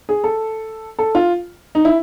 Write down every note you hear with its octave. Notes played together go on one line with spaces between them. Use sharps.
G#4
A4
A4
F4
D#4
E4